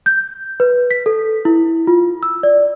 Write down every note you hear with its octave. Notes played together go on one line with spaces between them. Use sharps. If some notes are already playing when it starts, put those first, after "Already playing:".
G6
B4
B6
A4
E4
F4
E6
D5